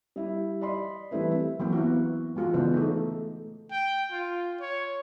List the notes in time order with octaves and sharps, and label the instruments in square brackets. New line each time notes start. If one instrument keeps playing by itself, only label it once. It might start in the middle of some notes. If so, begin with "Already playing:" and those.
[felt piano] G3 E4 G4
D5 D#5 B5 C6
E3 G3 A3 C4 E4 B4
[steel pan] E3 F#3 A#3 C4
B3 E4 F#4
E3 G#3 F4 F#4
C#3 E3 G#3 A3 B3 C5
A3 D#4
[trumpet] G5
F4
C#5